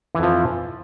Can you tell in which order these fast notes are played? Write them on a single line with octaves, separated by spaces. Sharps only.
E3 F2 F3